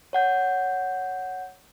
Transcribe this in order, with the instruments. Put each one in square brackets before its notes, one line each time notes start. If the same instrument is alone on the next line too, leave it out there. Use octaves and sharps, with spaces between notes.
[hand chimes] C#5 F#5 G6